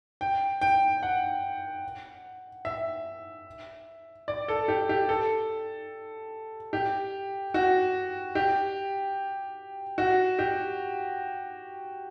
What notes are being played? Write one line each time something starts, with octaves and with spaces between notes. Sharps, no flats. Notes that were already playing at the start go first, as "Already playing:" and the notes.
G5
G5
F#5
E5
D5
A4
G4
G4
A4
G4
F#4
G4
F#4
G4